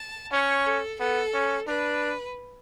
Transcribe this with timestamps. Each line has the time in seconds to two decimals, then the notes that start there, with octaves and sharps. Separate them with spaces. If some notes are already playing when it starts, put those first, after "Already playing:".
Already playing: A5
0.32 C#4 C#5
0.66 A4
0.99 B3 A4
1.34 C#4
1.67 D4 B4